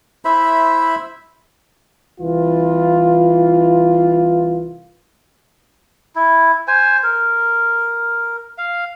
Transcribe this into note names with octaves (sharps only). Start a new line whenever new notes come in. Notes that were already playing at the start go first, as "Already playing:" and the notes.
E4 C5 E5 B5
C2 E3 F4
E4
C5 G#5
A#4
F5